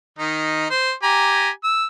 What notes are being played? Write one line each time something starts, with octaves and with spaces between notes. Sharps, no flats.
D#3 D#4
C5
G4 G#5 A#5
E6